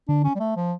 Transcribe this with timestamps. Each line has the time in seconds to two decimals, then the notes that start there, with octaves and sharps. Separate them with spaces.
0.08 D3 D4
0.24 C#4
0.35 G3
0.40 A3
0.56 F3